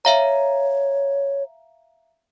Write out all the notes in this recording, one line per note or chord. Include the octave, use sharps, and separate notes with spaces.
C#5 E5 F5 A#5